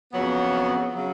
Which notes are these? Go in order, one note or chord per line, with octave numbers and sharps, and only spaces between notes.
F2 C#3 F#3 B3
C#3 F#3